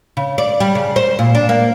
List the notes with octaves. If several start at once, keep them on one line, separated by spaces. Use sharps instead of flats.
C#3
D5
G3
C#3
C5
A#2
D4
A#3